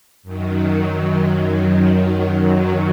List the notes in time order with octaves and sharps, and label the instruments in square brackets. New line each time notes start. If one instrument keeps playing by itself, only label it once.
[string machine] F#2 D#3 F#3